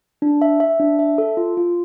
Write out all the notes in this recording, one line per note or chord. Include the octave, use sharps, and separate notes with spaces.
D4
E5
E5
D4
E5
A4
F4
F4